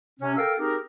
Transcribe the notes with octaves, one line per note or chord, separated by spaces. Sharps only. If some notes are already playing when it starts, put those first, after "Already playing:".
C3 C#4
A4 A#4 F5 G5 E6
C4 D#4 G4 G#4 A#4